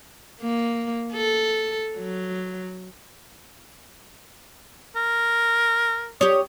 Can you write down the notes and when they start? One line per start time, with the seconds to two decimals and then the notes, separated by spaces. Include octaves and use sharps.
0.41 A#3
1.13 A4
1.98 F#3
4.96 A#4
6.21 G4 C#5 D#6